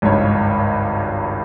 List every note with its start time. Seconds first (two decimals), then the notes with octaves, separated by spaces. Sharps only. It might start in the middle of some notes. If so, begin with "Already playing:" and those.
0.02 G#1 C#2 G2 C#5